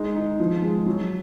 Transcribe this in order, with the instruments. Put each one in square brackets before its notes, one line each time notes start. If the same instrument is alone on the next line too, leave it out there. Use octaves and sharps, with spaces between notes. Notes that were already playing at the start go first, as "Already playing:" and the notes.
Already playing: [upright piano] G#3 D#4
D#4
F3
G#3
F#3